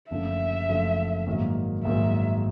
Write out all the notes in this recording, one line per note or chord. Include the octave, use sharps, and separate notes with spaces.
F#1 F#2 D3 F3 A3 E5
F#1 F#2 D3 F3 A3
A#1 G#2 D#3 F#3 A#3
A#1 G#2 D#3 F#3 A#3 E5